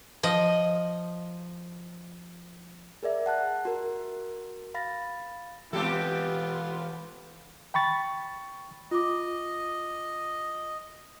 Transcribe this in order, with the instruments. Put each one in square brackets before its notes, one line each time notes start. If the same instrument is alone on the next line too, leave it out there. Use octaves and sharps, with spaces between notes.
[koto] F3 D#5
[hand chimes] G#4 A#4 D5 E5
F#5 A5 F#6
F#4 A#4
F5 B5 A6 A#6
[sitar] B2 G4 A4 [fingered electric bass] E3 G#3 [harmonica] B3 F4 B4
[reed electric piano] G5 B5 C#6 A6
[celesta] F4 D6 [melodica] D#5